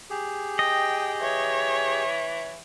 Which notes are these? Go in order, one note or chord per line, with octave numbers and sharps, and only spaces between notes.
G4 G#4
D#5 G5
E3 C#5